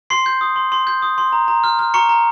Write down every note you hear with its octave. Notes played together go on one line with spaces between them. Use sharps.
C6 C7
G6
D#6
C6
C6
G6
D#6
C6
A#5
A#5
F6
F6
A#5 C#6 C#7
A#5